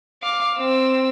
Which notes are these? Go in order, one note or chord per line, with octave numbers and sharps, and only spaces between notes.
F5 D6
C4 E6